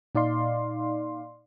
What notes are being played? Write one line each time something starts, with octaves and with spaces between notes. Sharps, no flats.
A#2 D#4 D5 F5 C6